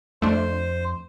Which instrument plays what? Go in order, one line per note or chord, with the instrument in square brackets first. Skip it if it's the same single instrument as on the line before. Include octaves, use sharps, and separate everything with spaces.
[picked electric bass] F2 [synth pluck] A3 D4 [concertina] C5